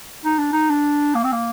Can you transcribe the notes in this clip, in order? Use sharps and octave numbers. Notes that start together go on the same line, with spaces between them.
D#4
D4
D#4
D4
A#3
C4
A#3